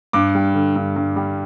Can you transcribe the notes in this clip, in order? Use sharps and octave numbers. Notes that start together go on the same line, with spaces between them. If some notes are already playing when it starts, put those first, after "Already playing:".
G2 D6
G3
D3
G2
G2
G3